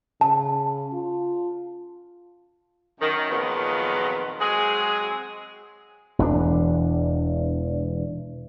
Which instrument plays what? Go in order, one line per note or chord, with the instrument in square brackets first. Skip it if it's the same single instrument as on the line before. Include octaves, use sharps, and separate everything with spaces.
[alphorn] C#3 [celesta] A5
[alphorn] F4
[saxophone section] F#2 D#3
F2 A#2 D#3 F#3 G#3 B3
F#3 G#3 C4 G#4
[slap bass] E1 E2 F#3 D4